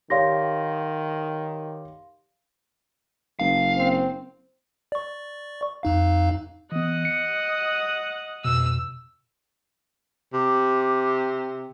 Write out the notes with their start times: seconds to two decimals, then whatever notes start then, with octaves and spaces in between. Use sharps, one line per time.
0.10 D#3 G4 C#5 D5 F5 C6 A#6
3.40 F#1 F5
3.77 C4
4.92 D5 C#6
5.83 F2 D#4 F5
6.72 E3 B3 D#5 F#5
7.05 C#7
8.45 F2 B2 E6
10.33 C3 D6